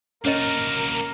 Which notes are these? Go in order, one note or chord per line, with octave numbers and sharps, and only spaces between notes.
A#3 C#4 F#4 A#4 C#5 D#5